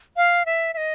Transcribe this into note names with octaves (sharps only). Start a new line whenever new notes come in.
F5
E5
E5
D#5